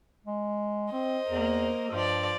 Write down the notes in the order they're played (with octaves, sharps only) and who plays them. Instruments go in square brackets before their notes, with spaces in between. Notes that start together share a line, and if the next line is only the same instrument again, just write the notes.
[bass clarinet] G#3
[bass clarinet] C4 [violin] C5 D#5
[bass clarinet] E2 [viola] A#3 A#4
[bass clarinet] G2 [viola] F3 D5